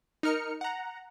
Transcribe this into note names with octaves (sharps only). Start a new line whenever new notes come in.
D#4 A#4 F6 C#7
F#5 A#5